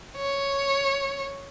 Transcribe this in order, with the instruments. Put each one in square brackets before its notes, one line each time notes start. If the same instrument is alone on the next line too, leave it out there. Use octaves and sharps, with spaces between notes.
[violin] C#5